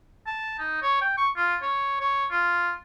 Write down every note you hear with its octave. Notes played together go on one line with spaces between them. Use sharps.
A5
D#4
C#5
G5
C#6
F4
C#5
C#5
F4